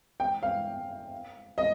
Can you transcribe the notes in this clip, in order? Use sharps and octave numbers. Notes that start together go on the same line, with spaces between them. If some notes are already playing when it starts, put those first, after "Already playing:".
G5
F5
D#5